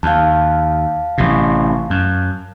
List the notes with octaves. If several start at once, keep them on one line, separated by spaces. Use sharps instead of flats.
D#2 F5 A5
A1 C3
F#2